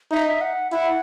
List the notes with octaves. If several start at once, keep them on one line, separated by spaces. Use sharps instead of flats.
D#4 E5
E5
F#5
E4 F#5